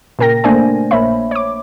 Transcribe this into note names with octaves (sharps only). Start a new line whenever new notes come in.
A#2 C#3 A#4 G5 A#6
A3 A#3 D4 C5 D5 G#5
A#1 A#3 C5 C#5 E5 B5
C#5 D6